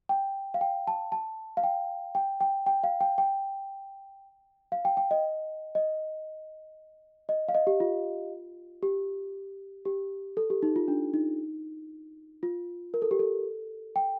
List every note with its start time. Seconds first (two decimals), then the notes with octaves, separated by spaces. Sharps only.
0.09 G5
0.54 F5
0.61 G5
0.87 A5
1.12 A5
1.57 F5
1.63 G5
2.15 G5
2.41 G5
2.66 G5
2.84 F5
3.01 G5
3.18 G5
4.72 F5
4.85 G5
4.97 G5
5.11 D#5
5.75 D#5
7.29 D#5
7.48 F5
7.55 D#5
7.67 G4
7.80 F4
8.83 G4
9.85 G4
10.37 A4
10.50 G4
10.63 D#4
10.76 F4
10.88 D4
11.14 D#4
12.43 F4
12.94 A#4
13.02 A4
13.11 G4
13.19 A4
13.96 G5